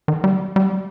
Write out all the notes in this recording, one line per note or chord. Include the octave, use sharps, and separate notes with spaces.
D#3
G3
G3